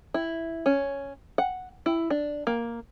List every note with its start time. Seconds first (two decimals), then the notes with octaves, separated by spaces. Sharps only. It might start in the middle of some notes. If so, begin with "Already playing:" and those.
0.14 E4
0.66 C#4
1.38 F#5
1.86 E4
2.10 D4
2.47 A#3